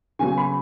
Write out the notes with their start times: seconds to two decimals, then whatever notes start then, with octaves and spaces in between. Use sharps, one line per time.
0.19 C#3 F#3 B3 G#5
0.38 B5